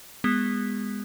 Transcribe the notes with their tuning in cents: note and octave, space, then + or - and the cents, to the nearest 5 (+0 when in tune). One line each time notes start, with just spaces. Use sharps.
G#3 -20 B3 +0 G#4 -30